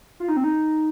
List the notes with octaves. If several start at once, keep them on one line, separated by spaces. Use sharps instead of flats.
F4
D#4
C4
D#4